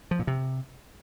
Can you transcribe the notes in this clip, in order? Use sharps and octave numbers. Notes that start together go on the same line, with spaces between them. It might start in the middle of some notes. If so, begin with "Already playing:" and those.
F3
A#2
C3